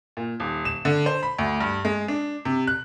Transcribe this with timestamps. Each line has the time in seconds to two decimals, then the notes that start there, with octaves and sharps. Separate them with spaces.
0.17 A#2
0.40 D#1
0.65 E7
0.85 D3
1.06 C5
1.23 B5
1.39 D2
1.61 G2
1.85 G#3
2.08 D4
2.45 C3
2.67 F#6